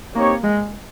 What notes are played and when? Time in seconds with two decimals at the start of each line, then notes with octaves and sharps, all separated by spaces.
0.15 A#3 C4 D#4 G4 C#5
0.43 G#3